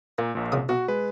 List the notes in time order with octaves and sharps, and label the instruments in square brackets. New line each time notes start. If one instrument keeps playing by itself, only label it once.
[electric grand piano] A#2 [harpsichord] A#3
[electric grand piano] A#1 A#2
[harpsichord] C2 C#3 D#6
[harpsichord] B1 [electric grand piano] F#4
[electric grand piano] G#3 B4